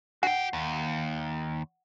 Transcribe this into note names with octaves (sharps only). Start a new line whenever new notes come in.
F#4 F#5 G5
D#2